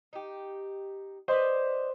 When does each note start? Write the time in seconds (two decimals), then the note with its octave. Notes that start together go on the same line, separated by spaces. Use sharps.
0.13 D#4 G4
1.28 B4 C5 D5 D#5